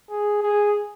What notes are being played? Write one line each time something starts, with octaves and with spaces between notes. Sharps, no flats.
G#4
G#4